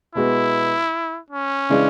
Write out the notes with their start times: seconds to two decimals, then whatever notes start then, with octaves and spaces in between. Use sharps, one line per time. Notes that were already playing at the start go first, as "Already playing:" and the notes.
0.15 B2 G#3 B3 E4 F#4
1.31 C#4
1.70 C#3 E3 G#3 D4